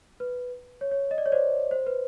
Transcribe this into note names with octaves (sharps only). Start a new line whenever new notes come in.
B4
C#5
C#5
D#5
D5
C#5
C5 D5
C5
B4